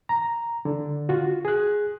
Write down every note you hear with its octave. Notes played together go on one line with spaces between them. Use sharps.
A#5
D3
F4 F#4
G#4 F#6